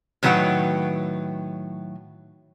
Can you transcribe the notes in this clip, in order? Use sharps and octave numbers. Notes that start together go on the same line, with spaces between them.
A2 D#3 F#3 B4 F#5 G5